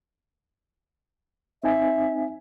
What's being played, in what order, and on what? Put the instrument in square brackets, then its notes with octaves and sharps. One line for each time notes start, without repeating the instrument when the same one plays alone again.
[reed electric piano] C4 D#4 G#5 [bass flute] E5